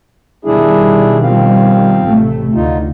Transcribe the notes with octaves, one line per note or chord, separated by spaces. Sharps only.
B2 D#3 G3 D4 E4 G#4
F3 C4 F5
A1 C3 A3
D2 D3 D#4 F4